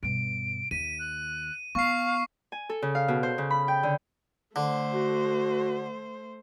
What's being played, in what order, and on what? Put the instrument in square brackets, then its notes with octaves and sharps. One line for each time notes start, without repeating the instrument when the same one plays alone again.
[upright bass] G2 B2 [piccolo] D7
[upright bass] D#2 [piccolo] B6 [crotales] D#7
[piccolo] F#6
[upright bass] B3 [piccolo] F5 [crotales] C#6 C7
[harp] G#5
A4
C#3
F5
B2
C5
C#3
B5
G5
D3
[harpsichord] D3 [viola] A3 C5
[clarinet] F#4